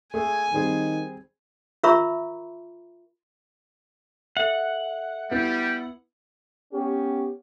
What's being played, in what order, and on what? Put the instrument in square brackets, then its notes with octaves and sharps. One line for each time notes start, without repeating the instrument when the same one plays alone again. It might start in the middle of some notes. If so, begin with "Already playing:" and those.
[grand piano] A3 G#4 [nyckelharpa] G#5
[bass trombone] D#3 [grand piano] G3 C4 G#4
[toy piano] F4 A#4 E5 A#5 B5 C#6
[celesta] A4 E5 [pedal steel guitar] F#5
[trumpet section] G3 [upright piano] B3 E4
[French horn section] B3 C#4 G4